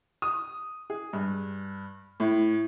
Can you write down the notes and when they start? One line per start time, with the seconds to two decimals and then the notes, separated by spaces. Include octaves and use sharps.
0.22 D#6
0.90 G#4
1.13 G2
2.20 A2